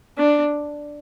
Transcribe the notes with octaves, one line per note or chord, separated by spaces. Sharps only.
D4